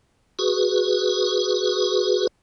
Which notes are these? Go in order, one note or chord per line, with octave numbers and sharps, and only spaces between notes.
F#4 G#4 B4